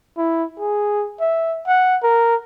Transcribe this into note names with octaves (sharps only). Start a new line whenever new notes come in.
E4
G#4
E5
F#5
A#4